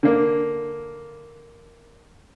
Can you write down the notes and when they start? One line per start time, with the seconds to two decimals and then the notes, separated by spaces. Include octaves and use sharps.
0.03 D3 A#3